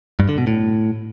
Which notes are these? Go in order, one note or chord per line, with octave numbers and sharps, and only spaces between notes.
G2
D3
B2
A2